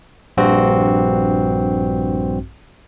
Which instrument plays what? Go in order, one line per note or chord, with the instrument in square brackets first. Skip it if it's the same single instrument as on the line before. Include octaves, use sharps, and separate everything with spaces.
[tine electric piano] A#1 G2 C4 F#4